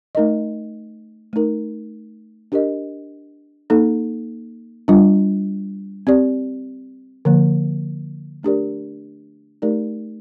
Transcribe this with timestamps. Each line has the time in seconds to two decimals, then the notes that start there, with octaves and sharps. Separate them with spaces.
0.15 A3 D#4 A#4 D#5
1.33 A3 D#4 A#4
2.52 D4 G4 A#4 D#5
3.70 A#3 D#4 A4
4.88 G3 D4 F4
6.07 C4 G4 D5
7.25 D3 F3 A#3
8.43 A3 D4 G4 A#4 D5
9.62 A3 D#4 G4 A#4 D5